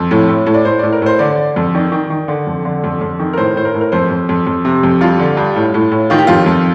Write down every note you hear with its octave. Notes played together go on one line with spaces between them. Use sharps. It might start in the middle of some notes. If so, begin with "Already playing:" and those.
Already playing: F2
A2
A2
A2
D5
A2 C5
A2 D5
A#4
A2 C5
D3 D5
D3
F2
D#3 D5
D#3
D#3
D3
F2
D3
F2
F2
D#3
A#4
A2 C5
A2 C5
A#4
A2
A#4
F2 C5
F2
F2
F2
C3
F2
G2 F4
D3
G2
A2
A2
A2
D#3 F4
G4
F2 F4
F2